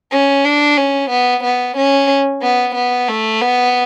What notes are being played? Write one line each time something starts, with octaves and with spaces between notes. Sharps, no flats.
C#4
D4
C#4
B3
B3
C#4
B3
B3
A3
B3